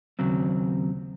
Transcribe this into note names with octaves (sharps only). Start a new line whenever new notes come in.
D#2 C#3 F#3 C4